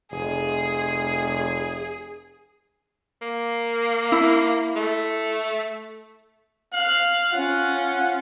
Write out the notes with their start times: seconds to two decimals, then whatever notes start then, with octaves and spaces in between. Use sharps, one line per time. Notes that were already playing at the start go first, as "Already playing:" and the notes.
0.12 F1 G#4
3.22 A#3
4.12 E4
4.76 A3
6.73 F5 F#6
7.32 C#4 F4 F#5